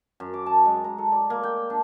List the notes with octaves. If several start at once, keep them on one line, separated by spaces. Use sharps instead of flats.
F#2
D6
A5
G#3
A#5
A4
D5
A#3
G5
D4